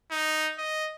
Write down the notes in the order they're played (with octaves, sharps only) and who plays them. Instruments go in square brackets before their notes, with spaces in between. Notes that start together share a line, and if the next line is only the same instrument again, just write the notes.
[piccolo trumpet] D#4
D#5